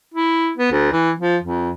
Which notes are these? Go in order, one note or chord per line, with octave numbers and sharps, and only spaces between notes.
E4
B3
D2
E3
F3
F2